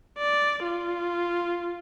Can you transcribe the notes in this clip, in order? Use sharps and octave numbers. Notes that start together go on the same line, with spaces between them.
D5
F4